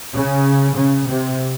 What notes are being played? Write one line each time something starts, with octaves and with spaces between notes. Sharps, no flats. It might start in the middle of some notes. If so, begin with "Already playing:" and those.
C#3
C#3
C3